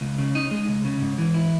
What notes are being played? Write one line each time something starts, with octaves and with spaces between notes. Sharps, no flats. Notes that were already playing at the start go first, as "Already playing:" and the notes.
C#2
C#3
D#4
G#3
C#2
C#3
G#2
E3
E4